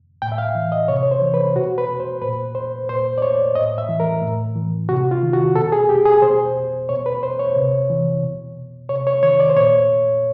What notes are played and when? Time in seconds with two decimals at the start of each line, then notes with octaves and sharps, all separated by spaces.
0.22 A2 G5
0.32 E5
0.38 F5
0.55 E3
0.72 D#5
0.88 C3 C#5
1.03 C#5
1.11 C5
1.21 E3
1.34 B4
1.55 B2 F#4
1.78 B4
2.00 C5
2.22 A#2 B4
2.55 C5
2.89 A#2 C5
3.18 D5
3.22 C#5
3.55 A2 D#5
3.78 E5
3.89 E3
4.00 A#4
4.22 A2
4.56 E3
4.89 C3 F#4
5.11 F4
5.23 D#3
5.33 F#4
5.55 B2 A4
5.72 G#4
5.89 G4
6.06 G#4
6.22 B2 C5
6.89 B2 C#5
7.06 B4
7.23 C5
7.39 C#5
7.56 C3
7.90 E3
8.23 B2
8.89 C3 C#5
9.07 C#5
9.23 D#3 C#5
9.40 D5
9.49 C5
9.56 A#2 C#5